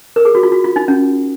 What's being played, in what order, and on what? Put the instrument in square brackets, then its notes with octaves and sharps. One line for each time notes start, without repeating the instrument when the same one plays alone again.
[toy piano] A#4
G#4
F#4
F4
F#4
F4
D#4
C#4